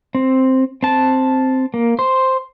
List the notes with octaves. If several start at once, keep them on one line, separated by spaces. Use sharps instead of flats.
C4
C4 A5
A#3
C5